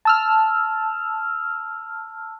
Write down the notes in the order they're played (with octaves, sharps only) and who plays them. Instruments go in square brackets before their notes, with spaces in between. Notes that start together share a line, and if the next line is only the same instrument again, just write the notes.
[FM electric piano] A5 E6 F6